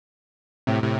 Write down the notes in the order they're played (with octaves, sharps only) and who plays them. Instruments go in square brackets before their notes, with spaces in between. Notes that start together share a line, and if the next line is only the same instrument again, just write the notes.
[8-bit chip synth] A2 C3
A2 C3